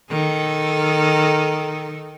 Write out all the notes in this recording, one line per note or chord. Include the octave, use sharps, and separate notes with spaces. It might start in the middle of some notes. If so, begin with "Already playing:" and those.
D#3 A4